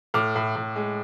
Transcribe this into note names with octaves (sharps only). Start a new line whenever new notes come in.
A2 D6 F6
A2
A2
G#3